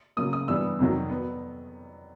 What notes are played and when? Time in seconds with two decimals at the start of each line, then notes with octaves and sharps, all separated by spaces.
0.17 C#3 F#3 A#3 D#6
0.33 D#6
0.48 G2 E3 G3 B3 E6
0.79 F2 C3 D#3 F#3
1.10 B3